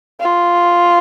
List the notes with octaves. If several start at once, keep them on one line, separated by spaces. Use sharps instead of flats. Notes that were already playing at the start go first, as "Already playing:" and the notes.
F4